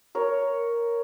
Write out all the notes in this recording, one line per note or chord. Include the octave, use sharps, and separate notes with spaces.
A#4 C#5